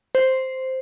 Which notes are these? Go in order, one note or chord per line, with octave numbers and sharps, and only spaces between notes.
C5